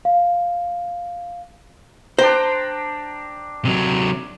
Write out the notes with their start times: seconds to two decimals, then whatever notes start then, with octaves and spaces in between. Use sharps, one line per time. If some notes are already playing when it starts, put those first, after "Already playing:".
0.05 F5
2.19 D4 C5 G5 A#5
3.65 C3 F#3